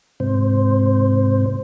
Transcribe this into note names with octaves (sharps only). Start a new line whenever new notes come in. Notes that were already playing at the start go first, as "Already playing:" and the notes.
G#2 C3 C5